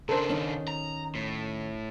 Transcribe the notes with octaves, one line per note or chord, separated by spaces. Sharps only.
C#3 D4 A4 A#4 C5
D#3 C#4 D#4
A#5
A2